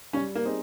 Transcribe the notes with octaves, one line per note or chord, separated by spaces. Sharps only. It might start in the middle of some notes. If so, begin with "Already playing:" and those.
G3 C#4
A#3
C4 D#4 G#4 D#5